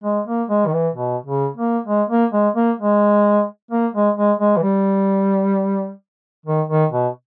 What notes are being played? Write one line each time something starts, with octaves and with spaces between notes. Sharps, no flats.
G#3
A#3
G#3
D#3
E3
B2
C#3
A#3
G#3
A#3
G#3
A#3
G#3
A#3
G#3
G#3
G#3
E3
G3
D#3
D#3
B2